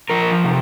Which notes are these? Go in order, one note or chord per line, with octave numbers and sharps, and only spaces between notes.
F3 A#4
C3